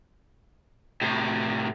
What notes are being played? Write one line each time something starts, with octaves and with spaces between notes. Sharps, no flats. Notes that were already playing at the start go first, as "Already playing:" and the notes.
A2 C3